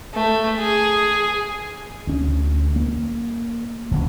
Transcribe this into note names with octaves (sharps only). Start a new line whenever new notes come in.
A3
G#4
D2 C#4
A#3
E1 D2 C#3